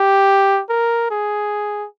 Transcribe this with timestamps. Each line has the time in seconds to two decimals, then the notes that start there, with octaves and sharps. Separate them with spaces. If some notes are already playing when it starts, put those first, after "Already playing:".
Already playing: G4
0.69 A#4
1.11 G#4